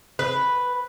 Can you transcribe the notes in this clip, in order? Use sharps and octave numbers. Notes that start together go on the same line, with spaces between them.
B4